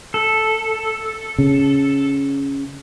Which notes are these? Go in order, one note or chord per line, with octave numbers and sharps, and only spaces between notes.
A4
C#3